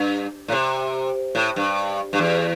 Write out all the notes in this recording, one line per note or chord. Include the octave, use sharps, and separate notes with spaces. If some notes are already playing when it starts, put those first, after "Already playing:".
Already playing: G2
A2
C3
A2
G2
G2
E2